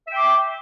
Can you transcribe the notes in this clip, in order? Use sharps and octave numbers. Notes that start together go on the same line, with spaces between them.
E5 G5 C6 D6